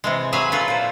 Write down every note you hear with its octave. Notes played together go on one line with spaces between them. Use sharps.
C3 E3 G#3
F#3 G#4 B4 E5 F5 G#5
F4 A4 B4
A#2 C5